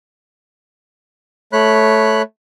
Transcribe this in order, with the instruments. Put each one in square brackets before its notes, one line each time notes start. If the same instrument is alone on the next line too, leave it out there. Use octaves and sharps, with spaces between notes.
[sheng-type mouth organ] A3 C#5 B5 F#6